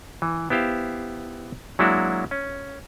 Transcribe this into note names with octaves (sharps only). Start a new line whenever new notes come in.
E3
B3 E4 G4 C5 F5
F#3 G#3 A#3 D4 E4 F#4
C#4